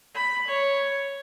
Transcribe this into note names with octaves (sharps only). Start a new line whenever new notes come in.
B5
C#5